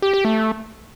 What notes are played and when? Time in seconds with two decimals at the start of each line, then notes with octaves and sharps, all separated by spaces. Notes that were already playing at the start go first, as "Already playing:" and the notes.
0.02 G4
0.14 G4
0.25 A3